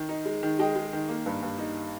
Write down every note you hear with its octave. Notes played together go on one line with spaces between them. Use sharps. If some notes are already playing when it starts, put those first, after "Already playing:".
Already playing: D#3
D#4
G#3
D#3
G#3 D#5 G5
G#3
D#3
A#3
G2
G2
D#4